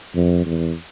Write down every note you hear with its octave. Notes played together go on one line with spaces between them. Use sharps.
F2
E2